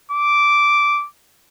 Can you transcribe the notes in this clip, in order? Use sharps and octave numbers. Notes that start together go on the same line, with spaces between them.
D6